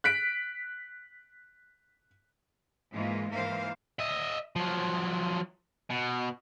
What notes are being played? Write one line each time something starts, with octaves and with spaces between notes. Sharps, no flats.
F#6 B6 D7
G#2 E3 G#3 A#3 F4
G#2 E3 A#3 A#4 C5 F5
D#5 E5
F3 F#3
B2